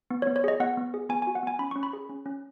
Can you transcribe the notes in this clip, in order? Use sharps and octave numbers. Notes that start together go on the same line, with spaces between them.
B3
C#5
B3
C#5
G#4 D#5
B3 F#5
B3
G#4
B3 G#5
F#4 G#5
F#5
B3 G#5
C#4 B5
C#4 C#6
B5
G#4
C#4
C#4